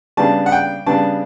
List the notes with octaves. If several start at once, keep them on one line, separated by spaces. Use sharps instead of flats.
C#3 G3 B3 D4 A5
F#5
G5
C#3 G3 B3 D4 A5